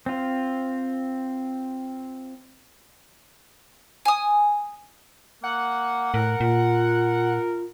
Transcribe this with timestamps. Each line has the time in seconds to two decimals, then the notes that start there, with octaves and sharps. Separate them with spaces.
0.06 C4 F4
4.05 G#5 D#6
5.44 A#3 F#5
6.14 A2 A#4
6.40 A#2 F4